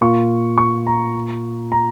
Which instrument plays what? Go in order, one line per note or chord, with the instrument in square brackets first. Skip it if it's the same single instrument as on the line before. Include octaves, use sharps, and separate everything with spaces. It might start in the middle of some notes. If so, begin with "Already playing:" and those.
[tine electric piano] A#2 A#3 F4 [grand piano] C#6
[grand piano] C#6
A#5
A#5